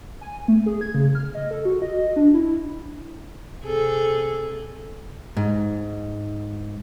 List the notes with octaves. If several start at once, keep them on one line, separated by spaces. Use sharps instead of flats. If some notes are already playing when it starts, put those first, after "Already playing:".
G#5
A3
G#4
G#6
C#3
F6
D#5
A4
F#4
D#5
D4
E4
C3 G#4 A4
G#2